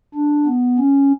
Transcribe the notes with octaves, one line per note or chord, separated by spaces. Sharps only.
D4
B3
C#4